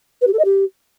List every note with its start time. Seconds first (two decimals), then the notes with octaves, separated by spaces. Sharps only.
0.21 B4
0.27 G4
0.33 A4
0.39 D#5
0.45 G4